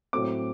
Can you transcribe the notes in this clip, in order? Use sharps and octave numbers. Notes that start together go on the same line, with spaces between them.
A2 F#3 A3 C4 D6